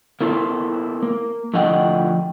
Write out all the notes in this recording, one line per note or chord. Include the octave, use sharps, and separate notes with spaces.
A#3 B3 E4 A4 C5
A#3
A2 D3 F3 D#5 F#5 G5